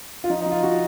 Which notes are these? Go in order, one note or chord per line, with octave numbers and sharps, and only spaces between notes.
F4
F3 D#4
F3 D#4
F4
F3 F#4